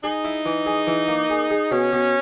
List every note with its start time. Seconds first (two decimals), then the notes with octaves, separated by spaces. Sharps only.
0.03 D#4 G#4
0.24 E4
0.46 E3
0.66 G#4
0.87 E3
1.08 A#3
1.30 G#4
1.50 G#4
1.71 B2 C#4
1.92 B2